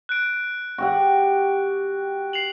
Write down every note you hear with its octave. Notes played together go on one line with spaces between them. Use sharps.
F#6 D7
F#4 G4 F#5
C7 F7 F#7